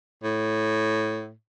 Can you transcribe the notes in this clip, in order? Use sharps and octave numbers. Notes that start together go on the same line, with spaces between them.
A2